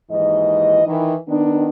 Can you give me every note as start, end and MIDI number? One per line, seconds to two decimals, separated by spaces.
0.10 0.82 39
0.10 0.82 44
0.10 0.82 52
0.10 0.82 75
0.85 1.14 51
0.85 1.14 52
1.28 1.69 51
1.28 1.69 59
1.28 1.69 62